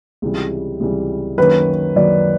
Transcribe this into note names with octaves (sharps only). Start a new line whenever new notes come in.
C#2 C3 E3 G3
C#2 C3 E3 G3
F#2 D#3 F#3 A#3 C#4 B4
F#2 D#3 F#3 A#3 C#4 D5